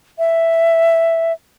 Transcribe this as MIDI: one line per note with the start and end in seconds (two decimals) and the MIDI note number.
0.19 1.33 76